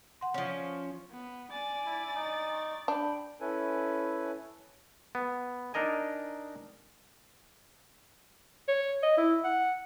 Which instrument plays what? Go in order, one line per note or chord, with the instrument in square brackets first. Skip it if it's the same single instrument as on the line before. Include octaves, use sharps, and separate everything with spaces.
[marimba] F#5 C6
[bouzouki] F3 C#4
[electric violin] B3
[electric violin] D5 A6 [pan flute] G#5
[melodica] E4
D#4
[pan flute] C#6
[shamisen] D4 [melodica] G5 [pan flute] B5
[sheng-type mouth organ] C#4 E4 A4 B4 G#5
[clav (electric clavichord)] B3
D4 D#4 A#4 D#5 G#5
[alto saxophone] C#5
D#5
E4
F#5